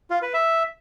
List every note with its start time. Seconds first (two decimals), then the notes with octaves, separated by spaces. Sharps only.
0.10 F4
0.22 B4
0.34 E5